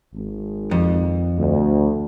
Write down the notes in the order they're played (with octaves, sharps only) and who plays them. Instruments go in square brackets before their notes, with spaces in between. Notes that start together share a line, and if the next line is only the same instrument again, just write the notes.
[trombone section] G#1
[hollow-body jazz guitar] F2
[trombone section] D2